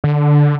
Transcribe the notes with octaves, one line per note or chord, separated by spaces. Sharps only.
D3